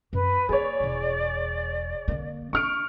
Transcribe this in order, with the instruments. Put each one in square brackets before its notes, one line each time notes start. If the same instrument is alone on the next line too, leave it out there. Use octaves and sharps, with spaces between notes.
[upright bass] F#2 [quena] B4
[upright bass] A#3 [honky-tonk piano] G#4 C#5 [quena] D5
[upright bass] E1 E2
D3 A#3
[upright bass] D4 [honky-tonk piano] C#6 F6 D7